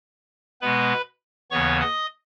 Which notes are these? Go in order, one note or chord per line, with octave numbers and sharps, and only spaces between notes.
B2 G#3 B3 B4 B5
D#2 C#3 E3 B3 C#5 C#6
D#5 D#6